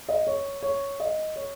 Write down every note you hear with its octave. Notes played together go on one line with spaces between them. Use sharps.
D#5
C#5
C#5
D#5
C#5